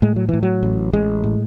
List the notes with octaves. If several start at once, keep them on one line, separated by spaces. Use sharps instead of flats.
A2 G#3
F#3
A2 E3
F#3
A1
A1 G#3
A2